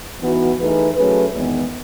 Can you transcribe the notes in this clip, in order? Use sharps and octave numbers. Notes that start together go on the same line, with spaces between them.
E3 B3 D#4 F#4
E3 A3 D#4 G#4 B4
F#3 A3 C#4 G#4 B4
E2 D#3 G#3 B3